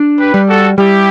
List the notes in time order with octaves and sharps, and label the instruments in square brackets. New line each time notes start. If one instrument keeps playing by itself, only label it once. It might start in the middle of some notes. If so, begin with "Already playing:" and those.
Already playing: [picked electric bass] D4
[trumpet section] G4 B4
[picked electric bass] G3
[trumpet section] F#4 A4
[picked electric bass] G3 [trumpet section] E4 G4